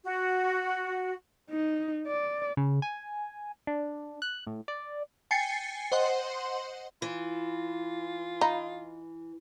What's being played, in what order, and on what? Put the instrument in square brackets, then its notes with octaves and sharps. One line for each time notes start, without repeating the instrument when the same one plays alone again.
[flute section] F#4
[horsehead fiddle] D#4
D5
[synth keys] C#3
G#5
D4
F#6
A2
D5
[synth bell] G5 G#5 A6 C7 C#7
C5 D#5 F#5 C6
[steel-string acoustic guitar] E3 [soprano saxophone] F4
[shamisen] D#4 [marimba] F5 A#5 B5